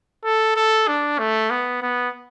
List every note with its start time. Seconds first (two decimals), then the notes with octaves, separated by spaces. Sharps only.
0.25 A4
0.56 A4
0.88 D4
1.19 A3
1.50 B3
1.82 B3